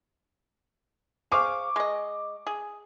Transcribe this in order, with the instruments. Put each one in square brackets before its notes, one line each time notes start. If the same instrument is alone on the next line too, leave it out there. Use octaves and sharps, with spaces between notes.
[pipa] G#4 C5 F5 [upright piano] C#6 D6
[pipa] G#3 D#5
G#4